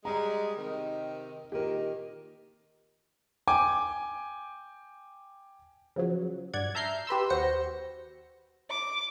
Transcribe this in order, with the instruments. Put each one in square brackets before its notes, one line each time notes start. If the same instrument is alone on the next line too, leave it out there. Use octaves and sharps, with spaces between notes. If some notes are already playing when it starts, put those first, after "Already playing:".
[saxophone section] G3 G#3 [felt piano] A#5
[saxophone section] C3 D#3
[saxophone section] A#2 D#3 [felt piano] G4 A#4
[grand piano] G5 G#5 D6
[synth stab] C#3 F3 F#3
G2 D5 F#5 G#6
E5 A5 A#5 F6 G6 C7
G4 B4 C6 E6
D#2 F#4 C5 A#6 C#7
[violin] D6